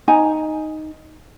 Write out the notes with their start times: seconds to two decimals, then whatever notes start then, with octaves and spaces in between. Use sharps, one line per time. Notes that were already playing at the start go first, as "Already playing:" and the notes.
0.08 D#4 G#5 A#5